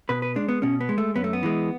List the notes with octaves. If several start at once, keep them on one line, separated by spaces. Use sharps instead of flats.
B2 B4
B4
G#3 D4
B3
B2 C#4
B3
G#3
A3
F#2 B3
A3
B3
E3 G#3